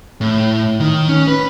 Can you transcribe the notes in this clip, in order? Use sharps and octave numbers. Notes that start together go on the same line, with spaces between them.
A2
D#3
C#4
B4